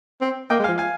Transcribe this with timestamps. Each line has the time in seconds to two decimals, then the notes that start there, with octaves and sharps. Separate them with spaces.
0.21 C4
0.50 A#3 D#5 G5
0.59 G#3
0.64 F5 G#5
0.68 F3
0.78 F5 G#5